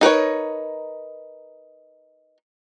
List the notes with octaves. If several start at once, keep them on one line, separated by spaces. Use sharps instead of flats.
D#4 A#4 B4 C#5